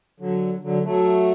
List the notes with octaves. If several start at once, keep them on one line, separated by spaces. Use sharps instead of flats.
D3 F#3
D3 F#3
F#3 A3